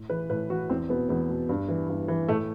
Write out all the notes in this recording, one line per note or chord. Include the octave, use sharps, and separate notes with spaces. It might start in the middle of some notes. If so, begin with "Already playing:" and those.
Already playing: A2
E3 B4
A2 B4
E3 F#4
E2 C4
B2 B3
E2 B3
B2
G2
E3
G2
E3
A2 A3